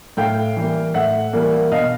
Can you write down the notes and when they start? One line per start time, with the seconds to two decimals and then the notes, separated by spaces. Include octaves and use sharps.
0.17 A2 F5 G5
0.56 E3 G3 A#3
0.94 A2 E5 F#5
1.33 E3 G3 A#3
1.72 B2 D#5 F5